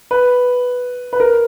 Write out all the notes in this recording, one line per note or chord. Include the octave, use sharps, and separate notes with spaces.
B4
B4
A#4